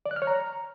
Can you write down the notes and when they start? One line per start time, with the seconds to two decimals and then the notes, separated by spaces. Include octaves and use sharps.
0.06 D5
0.11 F#6
0.16 F6
0.22 C#5
0.27 A#5